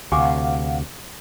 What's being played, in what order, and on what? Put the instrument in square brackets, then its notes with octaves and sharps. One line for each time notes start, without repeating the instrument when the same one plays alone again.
[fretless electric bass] D2 C3 [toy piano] G4 G#5 D6 [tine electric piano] F5 F#5